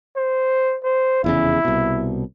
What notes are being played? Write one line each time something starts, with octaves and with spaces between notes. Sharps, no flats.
C5
C5
F1 E2 C#3 E4
C2 B2